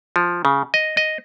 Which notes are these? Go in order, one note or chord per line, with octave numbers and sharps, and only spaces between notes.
F3
C#3
D#5
D#5